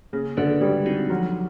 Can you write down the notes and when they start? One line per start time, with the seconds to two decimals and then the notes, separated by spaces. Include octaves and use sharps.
0.13 C#3 A#3
0.37 D3 D4 F#4 B4
0.61 G3 G#3
0.86 C4 D#4 F#4
1.10 F3 F#3